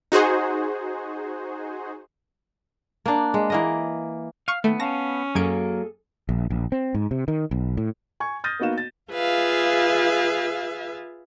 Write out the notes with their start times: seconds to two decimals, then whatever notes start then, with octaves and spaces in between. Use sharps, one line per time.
0.12 D#4 F#4 G#4 C5
3.06 A#3 D4
3.34 G#3
3.50 E3 A#3 D#5
4.48 F5 C#6 D#7
4.64 D#2 A3 B3
4.80 C#4 F5 A5 A#6
5.35 F#2 F#3 A#3 G#4 A4 G#5 G#6 D7
6.29 A#1
6.50 A#1
6.72 C4
6.94 G#2
7.11 C3
7.28 D#3
7.51 B1
7.77 A2
8.20 G#5 C#6 G#6
8.44 D#6 F6 G6 A6 A#6 D#7
8.59 A#3 B3 D#4 F#4 F5 E7
8.78 A6
9.12 F4 G#4 B4 E5 F5